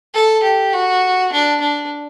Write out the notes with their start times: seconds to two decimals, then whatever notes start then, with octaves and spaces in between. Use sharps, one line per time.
0.14 A4
0.43 G4
0.73 F#4
1.32 D4
1.61 D4